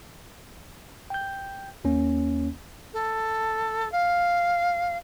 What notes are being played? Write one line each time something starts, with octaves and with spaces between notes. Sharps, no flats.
G5 G6
D#2 A#3 C#4
A4
F5